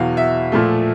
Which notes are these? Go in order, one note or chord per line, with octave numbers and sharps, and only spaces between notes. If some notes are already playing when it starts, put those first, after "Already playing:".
Already playing: E2 B2 F#3 F5
E5
A#2 F3 A3